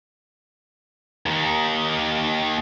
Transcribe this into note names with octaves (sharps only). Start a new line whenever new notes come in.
D#2 D#3